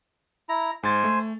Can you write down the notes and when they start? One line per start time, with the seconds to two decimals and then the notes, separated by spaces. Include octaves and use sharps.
0.49 E4 A#5
0.83 G#2 C5 G#5 A6
1.04 A3